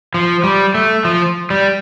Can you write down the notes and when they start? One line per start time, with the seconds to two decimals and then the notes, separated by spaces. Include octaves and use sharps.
0.14 F3
0.44 G3
0.74 A3
1.05 F3
1.50 G3